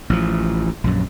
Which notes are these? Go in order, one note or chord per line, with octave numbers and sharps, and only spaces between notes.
A1 F3
A#1 F#2